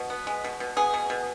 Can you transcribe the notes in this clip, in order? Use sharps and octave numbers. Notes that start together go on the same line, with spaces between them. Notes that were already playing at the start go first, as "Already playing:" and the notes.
Already playing: B2
B3
G#3
B2
B2
B3 G#4
B2
B2